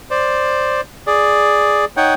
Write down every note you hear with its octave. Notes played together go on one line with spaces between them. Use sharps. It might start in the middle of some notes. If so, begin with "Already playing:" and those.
C5 D5
G#4 D5
D#4 C#5 F#5 G5